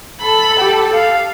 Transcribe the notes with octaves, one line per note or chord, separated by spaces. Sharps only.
A4 B5
G4
F5